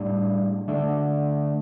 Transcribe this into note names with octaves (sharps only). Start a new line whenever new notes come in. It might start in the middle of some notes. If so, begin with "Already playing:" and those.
Already playing: A2 G3 D4
D3 A3 D4